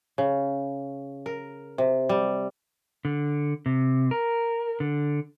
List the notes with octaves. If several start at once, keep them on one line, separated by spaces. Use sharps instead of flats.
C#3
A#4
C3
G3
D3
C3
A#4
D3